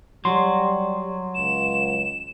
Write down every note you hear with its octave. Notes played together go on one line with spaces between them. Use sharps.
F#3 G3 C6
C#2 E7